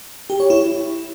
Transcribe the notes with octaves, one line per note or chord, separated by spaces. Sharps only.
G4
C#5
E4